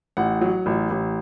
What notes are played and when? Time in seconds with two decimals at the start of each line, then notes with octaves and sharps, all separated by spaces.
0.17 A1 F#5
0.41 F#3
0.66 A1
0.90 A1